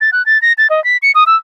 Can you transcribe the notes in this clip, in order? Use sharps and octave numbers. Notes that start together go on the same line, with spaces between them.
A6
F#6
A6
A#6
A6
D#5
B6
C#7
D#6
E6